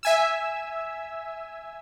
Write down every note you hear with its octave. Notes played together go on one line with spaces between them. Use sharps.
E5 G#5 E6